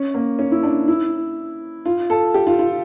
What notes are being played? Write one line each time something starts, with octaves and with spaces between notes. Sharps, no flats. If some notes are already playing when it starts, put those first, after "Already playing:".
Already playing: C#4
A#3
C#4
E4
D4
E4
F4
A4
G4
F4
F4